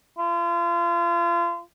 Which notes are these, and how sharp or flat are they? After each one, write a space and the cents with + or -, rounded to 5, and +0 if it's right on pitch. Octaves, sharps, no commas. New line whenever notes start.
F4 -35